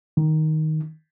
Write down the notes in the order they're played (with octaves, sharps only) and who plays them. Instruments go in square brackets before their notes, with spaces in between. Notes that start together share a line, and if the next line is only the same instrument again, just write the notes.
[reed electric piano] D#3